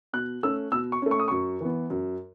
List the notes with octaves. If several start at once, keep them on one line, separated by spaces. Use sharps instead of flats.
B2 F#6
A3 C#4 E6
B2 E6
C#6
A3 C#4
C#6
D#6
F#2 C#6
E3 B3
F#2